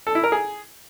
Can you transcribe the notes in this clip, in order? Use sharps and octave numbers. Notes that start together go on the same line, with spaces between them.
A4
E4
A#4
G#4